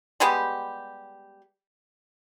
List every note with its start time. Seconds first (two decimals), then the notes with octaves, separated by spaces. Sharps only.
0.20 G3 G#3 B3 G4